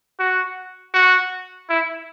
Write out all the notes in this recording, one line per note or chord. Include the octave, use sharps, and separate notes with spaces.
F#4
F#4
E4